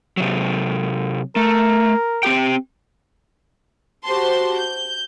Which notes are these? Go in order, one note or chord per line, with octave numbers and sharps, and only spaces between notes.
C3 F#3
A3 A#4
C4 G4 G5
F#4 G4 C5 A5 C6
G6